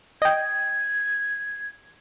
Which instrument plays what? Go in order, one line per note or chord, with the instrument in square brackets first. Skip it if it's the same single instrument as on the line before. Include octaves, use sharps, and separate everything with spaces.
[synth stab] D#5 G5 [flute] G#6